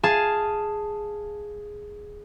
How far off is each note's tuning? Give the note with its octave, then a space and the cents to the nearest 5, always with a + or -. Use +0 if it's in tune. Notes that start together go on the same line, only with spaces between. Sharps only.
G#4 +0 F5 +0 A5 +0